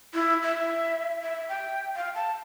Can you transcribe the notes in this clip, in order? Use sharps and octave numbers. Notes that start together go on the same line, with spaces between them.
E4
E5
E5
G5
F5
A5